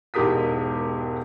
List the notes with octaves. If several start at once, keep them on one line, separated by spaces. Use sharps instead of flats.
E1 G#2 G4 A#4 D#6 B6